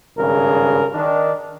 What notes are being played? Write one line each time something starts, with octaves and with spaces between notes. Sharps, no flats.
G#1 G2 C#3 A#4
D#3 D4